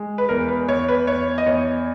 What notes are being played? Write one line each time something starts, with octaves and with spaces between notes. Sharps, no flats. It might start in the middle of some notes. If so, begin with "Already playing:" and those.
Already playing: G#3
B4
E2 A#4
B4
E2 C#5
B4
E2 C#5
D#5
E2 C#5